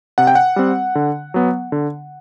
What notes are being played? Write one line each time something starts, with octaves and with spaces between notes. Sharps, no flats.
C3 F#5
G5
F#5
G3 C4
D3
F#3 B3
D3